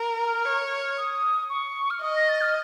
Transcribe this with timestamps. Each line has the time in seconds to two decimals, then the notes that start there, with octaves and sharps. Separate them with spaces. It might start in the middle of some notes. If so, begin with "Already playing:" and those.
Already playing: A#4
0.28 F6
0.45 C#5
0.97 D#6
1.50 C#6
1.90 F6
2.02 D#5 D#6
2.16 A#6
2.29 A6
2.41 F6